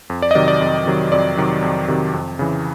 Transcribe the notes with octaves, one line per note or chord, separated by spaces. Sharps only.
F2
D5
D#5
C3 D#3 F#3 D5
D5
F2
C3 D#3 F#3
F2 D5
C3 D#3 F#3
F2
C3 D#3 F#3
F2
C#3 E3